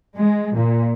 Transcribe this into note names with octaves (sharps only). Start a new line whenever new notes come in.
G#3
A#2